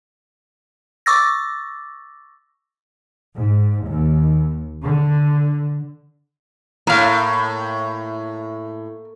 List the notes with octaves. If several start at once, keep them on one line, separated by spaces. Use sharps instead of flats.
C#6 D6 E6 A6 A#6
G#2
D#2
D3
A2 A#3 F5